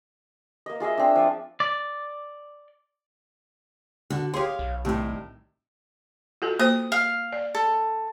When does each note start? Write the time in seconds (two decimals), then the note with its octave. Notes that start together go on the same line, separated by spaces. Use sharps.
0.66 A#3 D#5
0.80 F4 G#4 D#5 E5
0.97 C4 D4
1.15 F3 D5
1.60 D5
4.10 D3 F#4
4.34 G4 G#4 C#5 F5 C6
4.59 B1
4.85 A2 C3 D#3 G3
6.42 F4 F#4 A4
6.59 A#3 C5 D#6
6.92 F5
7.33 D5
7.55 A4